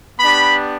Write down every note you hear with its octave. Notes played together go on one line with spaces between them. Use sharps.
B3 D4 G4 B5